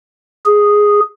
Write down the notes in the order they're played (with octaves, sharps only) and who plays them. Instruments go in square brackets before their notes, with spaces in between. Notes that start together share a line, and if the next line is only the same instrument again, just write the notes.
[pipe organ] G#4